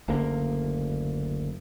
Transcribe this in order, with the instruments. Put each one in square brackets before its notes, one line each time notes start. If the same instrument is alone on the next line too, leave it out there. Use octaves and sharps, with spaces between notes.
[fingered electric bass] F#1 D2 D3 A#3